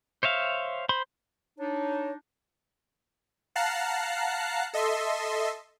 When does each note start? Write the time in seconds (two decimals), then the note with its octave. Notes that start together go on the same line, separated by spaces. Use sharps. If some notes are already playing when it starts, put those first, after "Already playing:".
0.23 C5 C#5 E5 F5
0.89 C5 B5 C6
1.59 D4 D#4 C#5
3.56 F5 F#5 A5 A#5 F#6 C7
4.73 A4 D#5 E5 C6